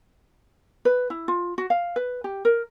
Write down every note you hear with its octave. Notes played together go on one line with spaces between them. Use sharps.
B4
E4
F4
F#4
F5
B4
G4
A#4